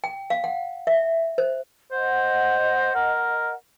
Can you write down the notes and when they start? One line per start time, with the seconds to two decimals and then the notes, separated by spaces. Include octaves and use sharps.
0.04 G5
0.30 F5
0.44 F#5
0.87 E5
1.38 C5
1.92 C5 D#5 F#5
2.95 A#4